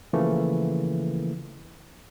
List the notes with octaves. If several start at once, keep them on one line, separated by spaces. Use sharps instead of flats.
C#3 E3 F3 A3 A#3